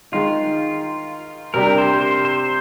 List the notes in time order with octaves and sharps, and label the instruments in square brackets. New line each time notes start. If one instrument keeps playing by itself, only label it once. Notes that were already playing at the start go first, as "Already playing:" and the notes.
[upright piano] D#3 G#3 D#4 [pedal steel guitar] F4
[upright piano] C3 G3 D4 G4 [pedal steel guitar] A#4
[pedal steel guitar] C5
C5
C5